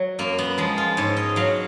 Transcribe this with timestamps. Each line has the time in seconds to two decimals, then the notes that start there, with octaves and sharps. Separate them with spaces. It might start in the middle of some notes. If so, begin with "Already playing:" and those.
Already playing: F#3
0.19 F#2 A#3
0.38 B3
0.58 F3 G#3
0.78 F4
0.97 G#2 C#5
1.17 D#5
1.36 F#3 F5